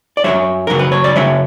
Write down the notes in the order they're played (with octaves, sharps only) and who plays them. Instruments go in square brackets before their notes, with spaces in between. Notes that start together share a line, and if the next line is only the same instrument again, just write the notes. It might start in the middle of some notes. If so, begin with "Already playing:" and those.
[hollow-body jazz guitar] D5
F#2 C#3 F#3 C#5 E5
F#2 C#3 F#3 A#4
B4
C#5
D5
F#2 C#3 F#3 C#5 E5